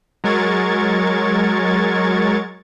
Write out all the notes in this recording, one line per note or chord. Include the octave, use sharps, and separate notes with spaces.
F#3 G#3 A#4 C#6 G#6 A6